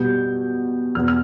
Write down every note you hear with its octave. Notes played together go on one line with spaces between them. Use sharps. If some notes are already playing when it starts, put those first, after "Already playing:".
Already playing: B2 G3 B3 G6
E2 B2 B3 F6
F6